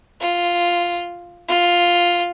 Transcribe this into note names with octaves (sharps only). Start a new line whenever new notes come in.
F4
F4